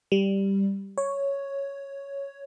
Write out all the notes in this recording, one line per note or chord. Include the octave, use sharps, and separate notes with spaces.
G3
C#5